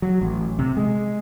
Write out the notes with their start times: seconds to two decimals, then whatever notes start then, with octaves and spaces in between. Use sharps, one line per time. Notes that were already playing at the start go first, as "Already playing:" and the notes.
0.02 F#3
0.21 A1
0.59 C3
0.77 G#3